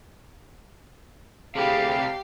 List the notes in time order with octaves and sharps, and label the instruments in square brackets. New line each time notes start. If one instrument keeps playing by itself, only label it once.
[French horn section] D2 G#4 [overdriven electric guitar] C3 G3 [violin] G4 C7 [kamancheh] F5